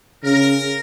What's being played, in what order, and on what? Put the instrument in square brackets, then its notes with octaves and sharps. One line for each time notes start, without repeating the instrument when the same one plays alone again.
[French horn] C#3 [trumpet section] A#4